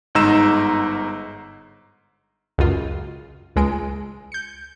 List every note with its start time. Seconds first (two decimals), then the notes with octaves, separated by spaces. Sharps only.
0.15 G1 G#2 D#4 A#5 E6 E7
2.58 C#2 F#2 F4
3.56 C#2 G#3 D7
4.32 G6 C#7